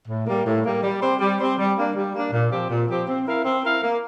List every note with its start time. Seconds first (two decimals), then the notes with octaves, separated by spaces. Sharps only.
0.08 A2
0.26 G3 A#3
0.45 A2
0.65 G3 A#3
0.83 G3
1.02 C4 G4 C5
1.20 G3
1.39 C4 G4 C5
1.58 G3
1.77 A#3 D4
1.95 G3
2.14 A#3 D4
2.32 A#2
2.51 F3 C4 G4
2.70 A#2
2.88 F3 C4 G4
3.07 C4
3.27 E4 A#4 F5
3.44 C4
3.64 E4 A#4 F5
3.82 A#3